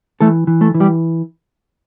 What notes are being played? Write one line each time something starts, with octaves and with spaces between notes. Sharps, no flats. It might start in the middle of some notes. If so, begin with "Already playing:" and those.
E3 A3 A4
E3
A3 A4
E3
G3 G4